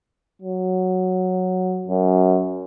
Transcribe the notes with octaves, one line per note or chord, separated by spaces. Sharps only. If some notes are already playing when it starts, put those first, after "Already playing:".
F#3
F#2